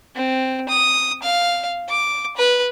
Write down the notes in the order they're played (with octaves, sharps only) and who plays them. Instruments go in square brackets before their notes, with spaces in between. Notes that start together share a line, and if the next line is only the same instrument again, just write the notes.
[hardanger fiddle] C4
D#6
F5
D6
B4